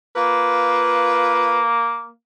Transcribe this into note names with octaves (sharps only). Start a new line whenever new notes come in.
A#3 F4 B4